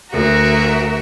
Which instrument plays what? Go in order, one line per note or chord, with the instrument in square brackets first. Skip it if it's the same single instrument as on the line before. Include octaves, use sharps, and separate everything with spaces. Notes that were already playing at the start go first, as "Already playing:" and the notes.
[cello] D2 [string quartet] F#4 A#4 E5